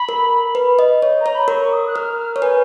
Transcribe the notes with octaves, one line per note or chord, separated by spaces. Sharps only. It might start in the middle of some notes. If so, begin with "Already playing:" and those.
Already playing: B5
A#4
B4
D#5
C#5
A#5
C#5
B5
A#4 C#6
C#6
D#6
F#6
A#4 F6
F6
C#5
B4 G#5